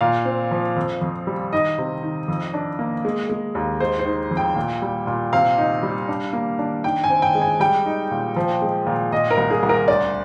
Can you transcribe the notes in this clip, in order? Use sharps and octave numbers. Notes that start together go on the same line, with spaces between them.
A#2 F5
C4
F3
F2
F2
G3
D#3 D#5
C3
D#3
F2
D4
A#3
G#3
G#3
D#2
G#3 C5
C5
D#3
F2
G5
A#2
G3
A#2
C3 F5
D#4
G3
D4
A#3
D4
D#3 G5
G#5
C4
G5
G#3
G#5
G3 G5
D#4
A#2
F3
G#3
A#2
A#2 D#5
A#4
C2
G#4
C2
A#4
D2 D5